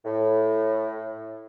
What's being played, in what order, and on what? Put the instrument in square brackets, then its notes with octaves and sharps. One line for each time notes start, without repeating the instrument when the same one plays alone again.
[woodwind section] A2